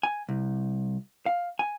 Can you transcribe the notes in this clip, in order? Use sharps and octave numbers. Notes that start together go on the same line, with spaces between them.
G#5
C2
F5
G#5